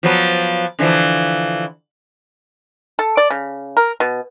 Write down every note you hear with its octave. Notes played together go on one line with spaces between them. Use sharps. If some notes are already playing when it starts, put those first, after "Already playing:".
F3 F#3 B3
D3 E3 F3
A4
D5
C#3
A#4
B2